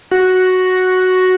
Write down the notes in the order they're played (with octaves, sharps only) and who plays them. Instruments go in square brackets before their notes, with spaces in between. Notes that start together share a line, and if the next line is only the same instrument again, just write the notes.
[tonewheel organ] F#4